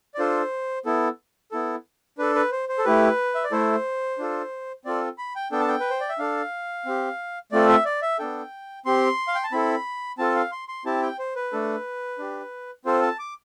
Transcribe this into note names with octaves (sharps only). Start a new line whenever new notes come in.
D5
D4 F4 A4 C5
B3 E4 A4
B3 E4 A4
D4 A4 B4
B4
C5
C5
A4
A3 E4 G4 B4
E5
D5
A3 E4 A4 C5
D4 F4 A4
C4 F4 A4 D5
B5
G5
B3 D4 A4 G5
A5
G5
B4
C5
D5
E5
D4 A4 F5
C4 G4
A3 C4 F4 A4 D5
E5
D5
E5
B3 D4 A4 G5
C4 G4 C6
F5
G5
A5
C4 E4 A4 B5
C4 F4 A4 A5
F5
C6
C6
C4 E4 G4 A5
G5
C5
B4
A3 D4 A4
D4 G4
C4 F4 A4 C5
A5
D6